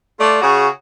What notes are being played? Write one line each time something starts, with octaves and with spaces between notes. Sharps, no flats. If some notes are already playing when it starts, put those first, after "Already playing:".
A3 F4 D5
C#3 F#4 G#4